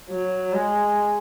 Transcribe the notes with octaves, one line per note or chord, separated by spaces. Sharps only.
F#3
G#3